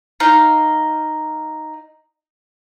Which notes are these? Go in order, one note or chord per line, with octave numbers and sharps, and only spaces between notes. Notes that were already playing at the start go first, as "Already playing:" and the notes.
D#4 F5